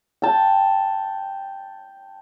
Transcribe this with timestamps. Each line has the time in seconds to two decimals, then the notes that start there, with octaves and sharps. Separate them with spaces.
0.22 G5 A5